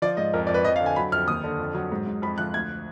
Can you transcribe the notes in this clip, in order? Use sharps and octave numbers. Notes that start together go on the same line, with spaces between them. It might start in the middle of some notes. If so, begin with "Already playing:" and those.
F3 D5
G#2 D#5
F2 A#4
F2 D5
B4
F2 D#5
F5
D3
G#5
F#3 B5
F2 F6
D#2 D#6
D3
F2
F#3
G#2
G#2
F2 B5
F3 F#6
D2 G#6